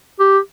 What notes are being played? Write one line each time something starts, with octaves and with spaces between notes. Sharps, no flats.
G4